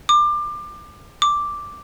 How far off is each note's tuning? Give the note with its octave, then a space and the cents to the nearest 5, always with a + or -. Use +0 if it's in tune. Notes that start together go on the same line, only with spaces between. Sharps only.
D6 +25
D6 +0